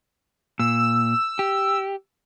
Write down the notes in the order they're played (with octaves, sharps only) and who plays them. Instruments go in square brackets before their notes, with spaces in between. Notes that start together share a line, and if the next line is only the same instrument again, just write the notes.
[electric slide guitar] A#2 [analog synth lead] E6
[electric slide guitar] G4